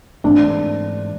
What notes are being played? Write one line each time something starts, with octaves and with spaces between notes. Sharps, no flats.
G#2 E3 A3 C4 D4